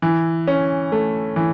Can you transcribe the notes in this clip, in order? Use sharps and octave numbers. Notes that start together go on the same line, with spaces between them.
E3
C#4
A3
E3